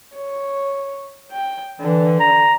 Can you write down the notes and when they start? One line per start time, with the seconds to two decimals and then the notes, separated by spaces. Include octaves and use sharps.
0.16 C#5
1.32 G5
1.81 D3 E3
2.20 A#5